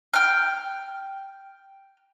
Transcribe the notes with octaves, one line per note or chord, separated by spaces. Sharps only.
G5 F6